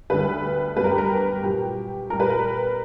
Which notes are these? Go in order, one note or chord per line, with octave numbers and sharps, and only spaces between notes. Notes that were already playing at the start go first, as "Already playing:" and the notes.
D2 D3 G3 B4
G2 F#3 B4
A#4
G4
A#4
A#2 F#3 G4
A#2 G3 A#4
B4
A#4